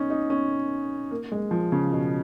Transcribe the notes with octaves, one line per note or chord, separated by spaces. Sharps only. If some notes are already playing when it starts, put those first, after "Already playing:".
Already playing: C#4 D#4
D#4
C#4
A#3
G#3
F3
C#3
B2